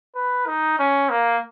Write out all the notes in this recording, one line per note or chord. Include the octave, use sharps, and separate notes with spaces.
B4
D#4
C#4
A#3